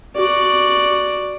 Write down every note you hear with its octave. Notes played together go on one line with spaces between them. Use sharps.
F#4 D5